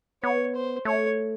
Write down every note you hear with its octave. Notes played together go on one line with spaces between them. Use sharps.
B3 C#5
C5
A3 C#5